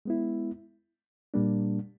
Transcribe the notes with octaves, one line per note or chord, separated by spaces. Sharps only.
G#3 B3 E4
A#2 G3 A#3 D4